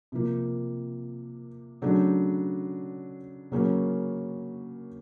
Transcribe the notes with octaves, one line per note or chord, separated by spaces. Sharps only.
C3 F3 A#3
C#3 F#3 A3 D4
C#3 F#3 A#3 C#4